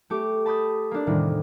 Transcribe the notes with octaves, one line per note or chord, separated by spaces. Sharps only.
A3 G4 C#6 D6
A5 B5 D6 D#6 G6 A6
A#3 D4
E2 A2 C3 D#3 G3